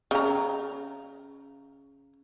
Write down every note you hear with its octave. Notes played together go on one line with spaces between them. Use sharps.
C#3 A#5